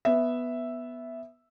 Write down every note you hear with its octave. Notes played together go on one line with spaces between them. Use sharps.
B3 E5